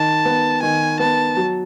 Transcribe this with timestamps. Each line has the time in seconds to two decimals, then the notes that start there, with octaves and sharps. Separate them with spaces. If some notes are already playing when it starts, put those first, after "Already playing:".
Already playing: D#3 A5
0.25 B3
0.63 D#3 G#5
1.00 B3 A5
1.37 F#3